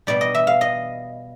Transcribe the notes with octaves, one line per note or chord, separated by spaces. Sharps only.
B2 G3 D5
D#5
E5
F5
D#5